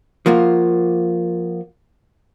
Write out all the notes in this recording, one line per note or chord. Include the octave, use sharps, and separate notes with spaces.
F3 A#3 F4 F#4